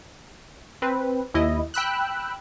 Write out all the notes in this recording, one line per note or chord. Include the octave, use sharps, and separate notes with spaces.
C4 B4
D#2 E4 D#5
G5 B5 E6 F#6